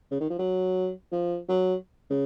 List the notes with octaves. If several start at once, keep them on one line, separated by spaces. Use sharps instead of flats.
C#3
D#3
F3
F#3
F3
F#3
C#3